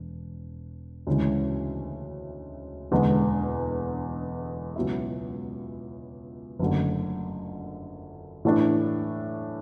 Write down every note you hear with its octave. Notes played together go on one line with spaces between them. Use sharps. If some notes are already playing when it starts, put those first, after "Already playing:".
Already playing: E1
D2 C#3 E3 G#3
E1 E2 D3 G#3
C#2 B2 F#3 B3 E4
F#1 F#2 D3 A3
A2 E3 A3 D4